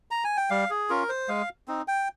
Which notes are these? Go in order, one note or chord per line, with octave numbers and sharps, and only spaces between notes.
A#5
G#5
G5
G3 F5
G#4
C#4 F4 A#4
C5
G#3 F5
C4 D#4
G5